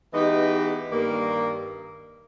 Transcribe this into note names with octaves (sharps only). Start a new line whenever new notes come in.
E3 G#3 B3 D#4 G4
G2 D#3 G3 A#3